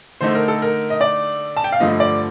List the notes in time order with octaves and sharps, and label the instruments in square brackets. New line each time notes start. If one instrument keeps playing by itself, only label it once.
[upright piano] D3 A3 D#4 [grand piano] C5
[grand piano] A#4
A4
A#4
D#5
D5
A5
G5
F5
[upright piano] G2 D3 F3 A3 D4 [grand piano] D#5
[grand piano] D5